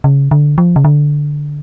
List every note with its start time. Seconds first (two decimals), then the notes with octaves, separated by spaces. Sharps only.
0.04 C#3
0.31 D3
0.58 F3
0.76 C#3
0.85 D3